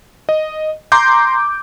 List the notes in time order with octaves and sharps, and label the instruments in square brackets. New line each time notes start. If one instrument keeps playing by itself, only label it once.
[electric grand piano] D#5
A#5 C6 D6 G6